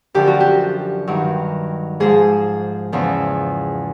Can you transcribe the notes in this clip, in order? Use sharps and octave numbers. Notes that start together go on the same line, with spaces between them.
F#2 D3 F3 G4
F#4
G4
G2 D#3 F#3
G#2 F3 G#4
E2 C#3 F3